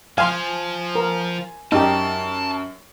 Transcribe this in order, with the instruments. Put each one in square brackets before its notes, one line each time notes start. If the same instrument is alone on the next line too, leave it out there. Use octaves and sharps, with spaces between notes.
[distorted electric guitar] F3 [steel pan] F5 [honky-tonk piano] G#5 C6
[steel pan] A#4
[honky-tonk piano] F#2 [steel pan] D#4 G4 [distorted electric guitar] A5